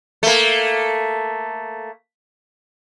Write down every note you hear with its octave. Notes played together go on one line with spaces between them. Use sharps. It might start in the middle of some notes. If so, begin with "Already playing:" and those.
A3 A#3